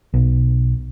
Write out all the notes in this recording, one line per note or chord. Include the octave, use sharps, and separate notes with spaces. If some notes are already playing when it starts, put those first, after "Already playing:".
B1